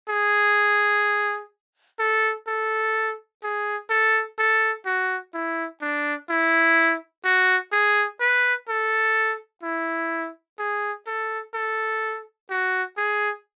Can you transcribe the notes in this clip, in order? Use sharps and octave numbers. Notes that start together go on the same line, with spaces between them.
G#4
A4
A4
G#4
A4
A4
F#4
E4
D4
E4
F#4
G#4
B4
A4
E4
G#4
A4
A4
F#4
G#4